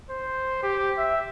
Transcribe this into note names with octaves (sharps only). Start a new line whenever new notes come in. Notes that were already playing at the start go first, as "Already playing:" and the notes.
C5
G4
E5